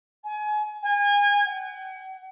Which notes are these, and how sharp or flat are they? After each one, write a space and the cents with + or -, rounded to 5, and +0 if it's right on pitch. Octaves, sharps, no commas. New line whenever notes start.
G#5 +30
G#5 -30
F#5 +40